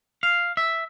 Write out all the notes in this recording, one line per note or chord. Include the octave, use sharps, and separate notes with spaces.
F5
E5